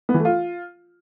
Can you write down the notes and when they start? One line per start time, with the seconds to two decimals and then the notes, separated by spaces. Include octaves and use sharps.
0.09 B3
0.14 E3
0.20 A3
0.25 F4